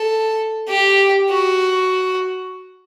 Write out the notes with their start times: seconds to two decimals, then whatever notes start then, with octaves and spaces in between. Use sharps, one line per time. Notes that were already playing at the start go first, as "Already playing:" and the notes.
Already playing: A4
0.68 G4
1.30 F#4